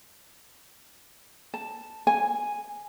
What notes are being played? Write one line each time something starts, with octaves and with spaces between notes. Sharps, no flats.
A5
G#5